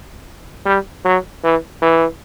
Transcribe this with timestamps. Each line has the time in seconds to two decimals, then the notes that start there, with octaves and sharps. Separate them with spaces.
0.66 G3
1.05 F#3
1.44 E3
1.82 E3